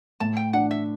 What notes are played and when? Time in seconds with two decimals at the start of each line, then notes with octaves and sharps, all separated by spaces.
0.20 A2 A5
0.37 G5
0.53 D4 F#5
0.71 E5